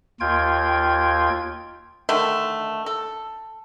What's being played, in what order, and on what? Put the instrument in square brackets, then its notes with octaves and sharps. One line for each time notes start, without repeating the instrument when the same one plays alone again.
[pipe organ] D#2 F4 G5 G#6
[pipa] D3 D#3 A3
A4